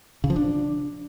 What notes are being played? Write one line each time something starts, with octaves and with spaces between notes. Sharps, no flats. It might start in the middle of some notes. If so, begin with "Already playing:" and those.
C#3
F3
D4